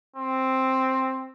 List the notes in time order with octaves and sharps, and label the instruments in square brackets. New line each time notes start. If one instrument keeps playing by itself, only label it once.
[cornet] C4